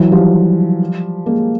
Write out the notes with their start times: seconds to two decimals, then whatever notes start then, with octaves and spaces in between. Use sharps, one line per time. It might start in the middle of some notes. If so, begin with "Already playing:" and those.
Already playing: E3 F#3
0.11 F3 G3
1.26 G#3 A#3